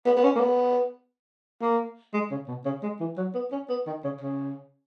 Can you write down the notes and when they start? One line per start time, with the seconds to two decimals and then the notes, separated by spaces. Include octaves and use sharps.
0.06 B3
0.16 B3
0.24 C#4
0.36 A#3
0.40 B3
1.62 A#3
2.14 G#3
2.31 C#3
2.48 B2
2.65 C#3
2.83 G#3
3.00 E3
3.17 F#3
3.34 B3
3.52 C#4
3.69 B3
3.87 D#3
4.04 C#3
4.21 C#3